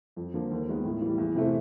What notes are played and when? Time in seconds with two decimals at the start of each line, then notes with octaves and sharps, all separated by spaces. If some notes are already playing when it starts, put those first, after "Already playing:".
0.16 F2
0.34 D3 F3 A#3
0.51 D#2
0.68 D#3 G#3 B3
0.85 A2
1.02 E3 G3
1.18 E2
1.35 C3 E3 A3 C4